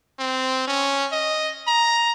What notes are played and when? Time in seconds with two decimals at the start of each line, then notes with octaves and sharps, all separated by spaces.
0.19 C4
0.67 C#4
1.12 D#5
1.67 A#5